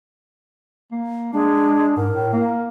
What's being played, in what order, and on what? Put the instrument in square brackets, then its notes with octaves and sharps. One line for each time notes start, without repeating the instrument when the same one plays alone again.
[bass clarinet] A#3
[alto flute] G#3 [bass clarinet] D4
[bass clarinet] G#2 [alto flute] A#4
[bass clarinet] A2
A#3